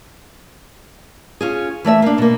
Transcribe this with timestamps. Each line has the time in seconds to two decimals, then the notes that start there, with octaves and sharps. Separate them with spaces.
1.41 C#4 F4 G#4
1.84 E3 A3 D5 E5
2.02 A#3 D4
2.18 B2 A#3